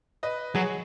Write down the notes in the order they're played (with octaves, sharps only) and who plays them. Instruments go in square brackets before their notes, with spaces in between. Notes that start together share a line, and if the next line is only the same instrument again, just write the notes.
[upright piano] B4 D#5
[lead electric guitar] F#3 [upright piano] G#4 C#5